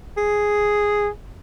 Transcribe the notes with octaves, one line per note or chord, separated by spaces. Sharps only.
G#4